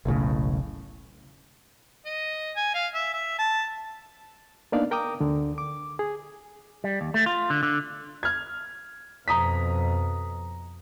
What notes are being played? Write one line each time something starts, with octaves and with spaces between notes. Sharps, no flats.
E1 B1 A2 C#3
D#5
G#5
F5
E5
E5
A5
A#3 B3 D4 D#4 D5 F5
A#4 G5 A#5 D6 D#6
D2 D3
D6
G#4
G3
D#2
A3
F4
D3
D3
F6 G#6
F2 B2 A#5 D#6 B6